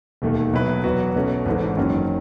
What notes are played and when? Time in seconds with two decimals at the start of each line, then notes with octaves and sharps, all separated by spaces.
0.22 E1 D#2 D#3 A3
0.53 B2 F#3 A3 E4 B4
0.84 E2 B2 F#3 B3 F#4
1.16 B1 B2 A3 C#4
1.46 G#1 G#2 E3 A3
1.76 F#1 F#2 D#3 F#3 C#4